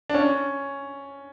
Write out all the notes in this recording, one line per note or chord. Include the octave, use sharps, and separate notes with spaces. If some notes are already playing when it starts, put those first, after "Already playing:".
D4
C#4